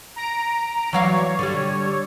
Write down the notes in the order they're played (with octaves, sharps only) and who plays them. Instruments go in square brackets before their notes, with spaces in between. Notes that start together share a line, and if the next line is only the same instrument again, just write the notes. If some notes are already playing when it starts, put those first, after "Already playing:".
[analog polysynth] A#5 D7
[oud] E3 F#3 F5 [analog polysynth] C#5 D5
[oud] D3 G3